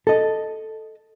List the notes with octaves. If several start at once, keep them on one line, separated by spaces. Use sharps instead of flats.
A4 D#5